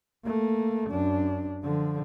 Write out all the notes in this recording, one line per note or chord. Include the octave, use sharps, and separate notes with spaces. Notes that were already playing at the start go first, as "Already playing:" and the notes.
A3 A#3
F#2 D4
D3 F3